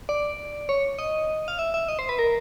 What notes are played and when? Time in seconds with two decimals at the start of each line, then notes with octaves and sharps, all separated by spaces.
0.09 D5
0.69 C#5
0.99 D#5
1.48 F5
1.59 E5
1.74 E5
1.89 D#5
1.99 C5
2.09 B4
2.19 A#4